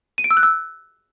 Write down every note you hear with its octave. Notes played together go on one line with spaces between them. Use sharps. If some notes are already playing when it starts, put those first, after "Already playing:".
D#7
D7
E6
F#6
E6